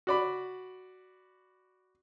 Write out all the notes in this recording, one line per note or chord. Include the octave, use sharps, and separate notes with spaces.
F#4 D5 B5